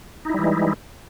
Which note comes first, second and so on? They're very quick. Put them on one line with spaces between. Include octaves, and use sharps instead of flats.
D#4 E4 G3 E3 G#3